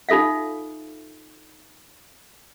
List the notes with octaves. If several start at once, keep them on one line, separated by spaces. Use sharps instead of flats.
D#4 F4 A4 E5 F5